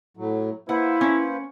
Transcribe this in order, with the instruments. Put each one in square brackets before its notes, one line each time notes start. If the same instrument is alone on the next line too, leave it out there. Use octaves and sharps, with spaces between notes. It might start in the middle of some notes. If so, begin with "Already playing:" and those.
[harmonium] A2 F#3
[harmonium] A#3 B4 C5 [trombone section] E4 [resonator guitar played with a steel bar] F#5
[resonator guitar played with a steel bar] C#4